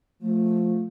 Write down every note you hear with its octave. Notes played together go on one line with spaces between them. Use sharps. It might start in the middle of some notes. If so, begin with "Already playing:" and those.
F3 A3